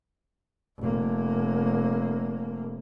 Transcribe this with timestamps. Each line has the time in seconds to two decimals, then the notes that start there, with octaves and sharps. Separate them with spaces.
0.78 F1 A#3